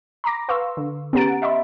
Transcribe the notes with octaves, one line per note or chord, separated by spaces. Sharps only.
A#5 B5 D6 A#6
B4 F5 C6 C#6 E6
D3
B3 C#4 G4 A#5 A6 D7
F#5
D#5 E5 B5 C6